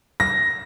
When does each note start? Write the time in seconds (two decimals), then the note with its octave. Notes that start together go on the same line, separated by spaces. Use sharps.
0.20 A#6